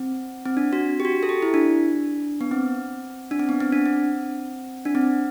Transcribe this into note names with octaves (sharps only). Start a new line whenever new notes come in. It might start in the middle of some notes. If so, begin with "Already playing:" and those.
Already playing: C4
C4
D4
F#4
G4
F#4
A4
G4
E4
D4
B3
C4
D4
C4
B3
C4
D4
C4
D4
C4